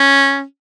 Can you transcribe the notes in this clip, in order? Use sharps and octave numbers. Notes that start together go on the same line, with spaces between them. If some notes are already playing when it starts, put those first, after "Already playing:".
Already playing: C#4